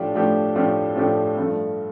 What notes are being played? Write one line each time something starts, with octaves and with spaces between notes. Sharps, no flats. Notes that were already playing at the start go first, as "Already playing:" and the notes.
Already playing: A2 F3 A3 D4 G4
A2 F3 A3 D4 G4
A2 F3 A3 D4 G4
A2 F3 A3 D4 G4
G2 F3 A3